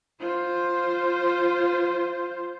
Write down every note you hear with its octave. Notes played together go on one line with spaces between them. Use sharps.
F4 C5